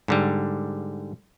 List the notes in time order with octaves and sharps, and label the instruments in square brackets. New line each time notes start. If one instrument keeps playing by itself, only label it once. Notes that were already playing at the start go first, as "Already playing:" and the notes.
[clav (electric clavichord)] G#2 D3 G3